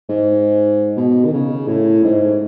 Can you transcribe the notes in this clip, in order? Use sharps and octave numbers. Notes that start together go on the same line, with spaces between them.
G#2
B2
D#3
C#3
A2
G#2